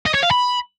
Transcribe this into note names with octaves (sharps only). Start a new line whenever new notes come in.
D#5
C#5
F5
B5